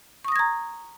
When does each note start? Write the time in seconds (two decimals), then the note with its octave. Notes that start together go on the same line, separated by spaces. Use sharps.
0.25 C#6
0.28 D#6
0.32 A#6
0.36 G#6
0.39 A#5